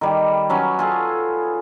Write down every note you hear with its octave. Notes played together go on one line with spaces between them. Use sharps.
D#3 G3 G4
F#3 C#4 F#4 B4
F4 G#4 A4